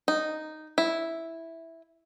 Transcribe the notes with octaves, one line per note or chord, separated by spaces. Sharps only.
D#4
E4